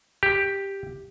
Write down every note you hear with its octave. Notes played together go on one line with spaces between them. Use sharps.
G4